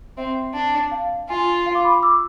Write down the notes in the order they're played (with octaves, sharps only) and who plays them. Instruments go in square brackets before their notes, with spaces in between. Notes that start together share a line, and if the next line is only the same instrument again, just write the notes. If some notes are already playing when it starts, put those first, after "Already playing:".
[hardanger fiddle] C4 [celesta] E5
[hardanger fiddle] D4
[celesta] F5
[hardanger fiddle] F4 [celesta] G#5
[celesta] F5
D6
B5
D6
E6